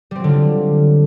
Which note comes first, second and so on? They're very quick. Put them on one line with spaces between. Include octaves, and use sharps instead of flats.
G3 C4 F#3 D3 F4